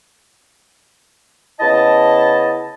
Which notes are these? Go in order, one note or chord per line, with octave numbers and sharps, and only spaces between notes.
C#3 B3 E4 D#5 A5